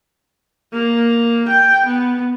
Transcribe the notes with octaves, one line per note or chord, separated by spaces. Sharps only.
A#3
G5
B3